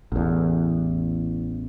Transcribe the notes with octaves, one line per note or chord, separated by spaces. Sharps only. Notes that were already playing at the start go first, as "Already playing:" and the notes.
A1 E2